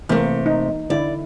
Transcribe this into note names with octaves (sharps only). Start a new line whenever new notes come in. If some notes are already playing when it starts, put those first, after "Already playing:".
C3 E3 A3 A#3
D#4
D3 E4 D5